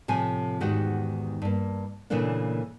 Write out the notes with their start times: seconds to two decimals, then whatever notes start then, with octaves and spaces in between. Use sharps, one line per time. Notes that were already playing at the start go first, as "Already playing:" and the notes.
0.08 A2 C3 F3 G#5
0.60 E2 G#2 D#3 F#4 G4 F#5
1.42 G2 A#3
2.10 A#2 C#3 E3 A3 A#3 D4